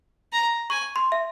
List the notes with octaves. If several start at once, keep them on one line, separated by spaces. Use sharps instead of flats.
A#5
G#5 C#6
C6
E5